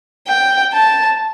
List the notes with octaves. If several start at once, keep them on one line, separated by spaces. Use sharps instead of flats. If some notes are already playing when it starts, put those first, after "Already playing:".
G5
A5